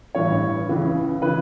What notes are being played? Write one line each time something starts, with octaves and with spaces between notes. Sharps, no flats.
A1 G2 E3 C#5
C#2 C#3 E3
C#3 E3 B4